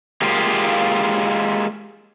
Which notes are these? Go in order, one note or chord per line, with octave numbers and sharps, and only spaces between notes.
G#3 A#3 F4 G4